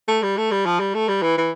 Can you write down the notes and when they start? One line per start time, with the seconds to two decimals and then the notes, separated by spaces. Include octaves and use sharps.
0.08 A3
0.22 G3
0.37 A3
0.51 G3
0.66 F3
0.80 G3
0.94 A3
1.08 G3
1.23 E3
1.38 E3